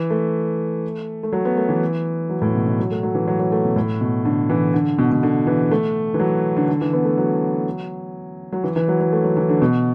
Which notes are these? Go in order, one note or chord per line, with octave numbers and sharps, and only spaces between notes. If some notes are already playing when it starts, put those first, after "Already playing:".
Already playing: E3
A3
A3
F#3
B3
A3
E3
F#3
A2
B2
B2
F#3
A3
F#3
E3
F#3
F#3
A3
B2
A2
B2
D3
E3
D3
B2
B2
D3
E3
A3
E3
F#3
D3
D3
E3
B3
A3
F#3
F#3
E3
E3
F#3
F#3
A3
F#3
E3
D3
B2